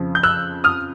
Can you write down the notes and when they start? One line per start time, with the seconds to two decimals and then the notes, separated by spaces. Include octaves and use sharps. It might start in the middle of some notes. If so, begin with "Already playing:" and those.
Already playing: F2 C#3 F3
0.15 G6
0.23 E6 F#6
0.64 D#6 F6